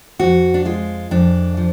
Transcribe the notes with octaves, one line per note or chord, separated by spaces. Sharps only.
F2 F#4
D4
G#3 F4
F2 D4
F3